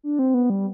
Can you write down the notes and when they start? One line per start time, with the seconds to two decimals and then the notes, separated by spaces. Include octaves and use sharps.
0.03 D4
0.19 C4
0.34 B3
0.50 G3